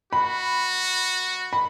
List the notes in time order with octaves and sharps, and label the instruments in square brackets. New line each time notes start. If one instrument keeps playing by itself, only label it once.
[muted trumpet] F#4 [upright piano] B5
[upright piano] B5